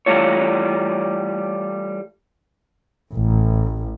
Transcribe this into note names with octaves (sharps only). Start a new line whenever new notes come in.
E3 G3 A3 F4 C#5
A1